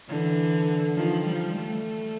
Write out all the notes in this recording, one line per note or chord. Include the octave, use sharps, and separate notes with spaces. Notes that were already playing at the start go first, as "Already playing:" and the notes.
D3 E3
D#3 F3
F3 G3
G3 A3